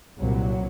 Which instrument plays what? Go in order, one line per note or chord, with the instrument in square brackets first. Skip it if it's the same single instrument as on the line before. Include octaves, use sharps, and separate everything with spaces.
[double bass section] C2 A#2 F#3